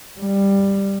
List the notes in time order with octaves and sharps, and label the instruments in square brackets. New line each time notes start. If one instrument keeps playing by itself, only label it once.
[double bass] G3